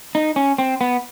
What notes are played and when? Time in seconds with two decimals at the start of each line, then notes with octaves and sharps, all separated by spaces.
0.15 D#4
0.36 C#4
0.58 C4
0.81 B3